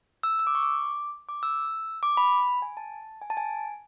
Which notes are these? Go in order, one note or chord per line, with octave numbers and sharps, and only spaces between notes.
E6
E6
D6
C#6
D6
D6
E6
D6
B5
G#5
A5
G#5
A5
G#5